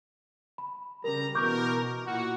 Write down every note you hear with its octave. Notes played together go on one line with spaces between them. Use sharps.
B5
C#3 G3 A#4 A#5
B2 E3 A#4 C#6 D6 G6
A#2 E4 F#4